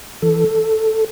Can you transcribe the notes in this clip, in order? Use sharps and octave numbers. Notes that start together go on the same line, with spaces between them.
E3 A4